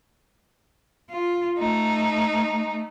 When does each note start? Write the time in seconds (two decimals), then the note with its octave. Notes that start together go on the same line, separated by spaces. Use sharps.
1.10 F4
1.58 A3 D#4